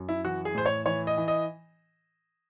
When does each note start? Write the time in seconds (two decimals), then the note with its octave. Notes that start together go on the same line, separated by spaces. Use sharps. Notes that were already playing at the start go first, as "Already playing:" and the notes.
Already playing: F#2
0.09 E4
0.25 E3 F#4
0.45 G#4
0.55 A2 C5
0.66 C#5
0.86 E3 C#5
1.07 D#5
1.17 E3
1.28 D#5